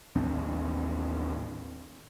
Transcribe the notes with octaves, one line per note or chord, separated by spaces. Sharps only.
A1 D#2 C4 D4